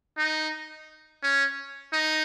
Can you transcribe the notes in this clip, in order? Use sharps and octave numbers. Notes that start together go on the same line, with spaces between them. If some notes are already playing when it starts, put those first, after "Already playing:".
D#4
C#4
D#4